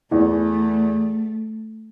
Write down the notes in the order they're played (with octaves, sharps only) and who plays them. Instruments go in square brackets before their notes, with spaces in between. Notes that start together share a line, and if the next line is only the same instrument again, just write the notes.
[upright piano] E2 E3 [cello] A3